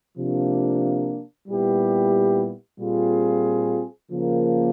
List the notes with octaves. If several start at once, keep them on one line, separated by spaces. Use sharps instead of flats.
C3 F3 A#3 D4
A#2 G3 B3 E4 G4
A#2 G3 C4 F4 G#4
C#3 F3 A#3